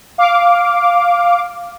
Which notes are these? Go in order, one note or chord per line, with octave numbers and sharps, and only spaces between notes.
F5 D6